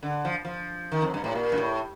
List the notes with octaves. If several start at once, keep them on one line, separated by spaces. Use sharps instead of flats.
D3
F3
F3
D#3
F2
G2
A2
A#2
G2
A2